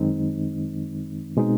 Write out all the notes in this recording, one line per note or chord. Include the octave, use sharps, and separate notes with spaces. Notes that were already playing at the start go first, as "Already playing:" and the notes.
Already playing: F#2 D#3 G#3 C4 D#4
B2 G#3 C4 D#4